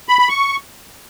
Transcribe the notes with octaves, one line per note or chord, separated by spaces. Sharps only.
B5
B5
C#6